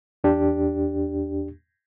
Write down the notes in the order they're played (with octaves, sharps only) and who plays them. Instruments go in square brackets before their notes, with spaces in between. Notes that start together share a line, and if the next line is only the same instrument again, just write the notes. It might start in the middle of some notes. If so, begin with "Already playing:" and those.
[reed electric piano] E2 D4 G4